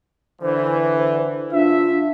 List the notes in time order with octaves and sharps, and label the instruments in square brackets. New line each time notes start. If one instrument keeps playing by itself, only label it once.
[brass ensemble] D3 E3 [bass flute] C5
[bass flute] D4 [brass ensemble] F4 E5